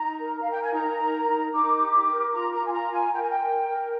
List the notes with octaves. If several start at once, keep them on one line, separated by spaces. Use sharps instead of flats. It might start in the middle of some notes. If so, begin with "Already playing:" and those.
Already playing: D#4 A#5
A#4
F5
A#4 G5
G#5
D#4 A#5
A#4
D#4
D#4 D6
G4
A#4
F4 A#5
A#5
F4
G#5
A#5
A#4
G#5
A#4 G5
G#5
G5
A#4
A#4